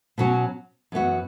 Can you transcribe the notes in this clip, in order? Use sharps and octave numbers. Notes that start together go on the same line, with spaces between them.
B2 F#3 C#4 F#4
F#2 E3 B3 F#4